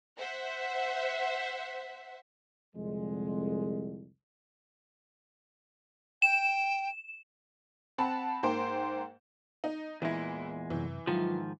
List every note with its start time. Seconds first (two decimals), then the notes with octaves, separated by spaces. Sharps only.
0.18 C5 E5 F#5
2.75 C2 F2 D3 G#3
6.22 G5 E7
7.98 C4 F#5 A5 B5
8.43 G#2 A#3 C5 G5
9.64 D#4
10.02 E2 A#2 E3 G#3 E4
10.70 F#2 C3 E3
11.07 G#2 D#3 F3 F#3 F4